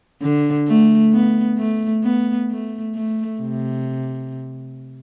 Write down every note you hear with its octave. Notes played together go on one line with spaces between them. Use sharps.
D3
A3
B3
A3
B3
A3
A3
C3